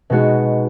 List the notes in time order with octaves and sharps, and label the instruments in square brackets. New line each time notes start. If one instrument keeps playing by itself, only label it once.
[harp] B2 G#3 B3 D#4 F#4